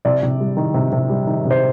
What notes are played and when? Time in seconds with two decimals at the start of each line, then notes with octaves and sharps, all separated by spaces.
0.05 C3 D5
0.23 C3
0.40 G3
0.57 D#3
0.74 C3
0.92 C3
1.10 G3
1.27 D#3
1.45 C3
1.51 C5